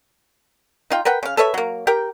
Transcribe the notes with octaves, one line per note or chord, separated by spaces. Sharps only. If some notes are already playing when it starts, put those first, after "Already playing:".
D#4 F4 G5
A#4 B4 F#5 G5
C#3 F5
A4 B4 C#5 E5
F#3 A#3
G4 A#4 G5